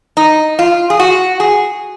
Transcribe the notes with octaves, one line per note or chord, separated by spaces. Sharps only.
D#4
F4
G#4
F#4
G#4